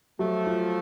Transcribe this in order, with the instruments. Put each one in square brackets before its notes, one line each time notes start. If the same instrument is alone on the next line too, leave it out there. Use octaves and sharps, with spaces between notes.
[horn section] F3 A3 [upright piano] F#3
[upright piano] F4